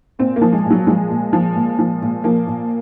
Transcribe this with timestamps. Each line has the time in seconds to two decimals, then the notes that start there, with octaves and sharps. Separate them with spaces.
0.19 A#2 C4
0.36 A#3
0.42 F3
0.53 G#3
0.65 A#2
0.70 F#3
0.87 F3 G#3
1.10 A#2
1.33 F3
1.56 A#2
1.79 F3
2.02 A#2
2.24 F3 A#3
2.47 A#2